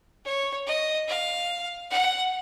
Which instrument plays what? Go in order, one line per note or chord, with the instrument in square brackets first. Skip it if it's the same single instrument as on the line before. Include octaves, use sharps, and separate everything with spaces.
[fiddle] C#5
D#5
F5
F#5